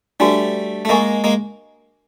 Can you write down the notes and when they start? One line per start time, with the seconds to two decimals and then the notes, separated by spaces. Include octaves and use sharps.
0.20 G3 A3 D4 F#4 B4
0.85 A3
0.89 G#3 A#3 A#4 D#5 G#5 C#6
1.24 G#3 A#3